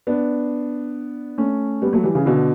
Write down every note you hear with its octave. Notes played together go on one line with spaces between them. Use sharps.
B3 D4
A3 C#4
G3 B3
F#3 A3
E3 G3
C#3 E3
B2 D3